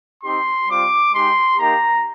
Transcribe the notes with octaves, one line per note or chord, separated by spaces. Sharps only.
C4 D#4 G4 C6
G3 C4 F4 D6
G#3 D#4 G4 C6
A#3 D#4 G4 A#5